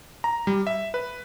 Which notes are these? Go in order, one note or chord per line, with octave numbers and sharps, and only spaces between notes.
A#5
G3
E5
B4